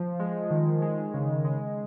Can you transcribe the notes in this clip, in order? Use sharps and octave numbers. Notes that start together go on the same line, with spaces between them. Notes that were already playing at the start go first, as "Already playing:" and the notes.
Already playing: F3
G#3
D#3
G#3
C#3
G#3